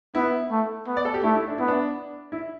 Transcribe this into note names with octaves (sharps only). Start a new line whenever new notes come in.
B3 E4
A3
B3
D5
A4
G4
A3 E4
E4
D4
B3 E4
D4
E4